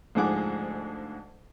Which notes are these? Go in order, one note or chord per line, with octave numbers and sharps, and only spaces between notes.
D2 G#2 F3 G#4 F#5 D6